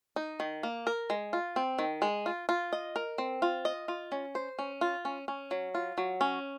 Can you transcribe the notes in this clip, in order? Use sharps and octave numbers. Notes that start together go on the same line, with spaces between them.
D#4
D#3
A#3
A#4
G#3
F4
C4
D#3
G#3
F4
F4
D#5
A#4
C4
F4
D#5
F4
C#4
C5
C#4
F4
C#4
C#4
F#3
F4
F#3
C#4